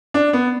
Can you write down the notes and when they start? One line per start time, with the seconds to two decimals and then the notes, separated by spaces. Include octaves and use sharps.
0.14 D4
0.33 B3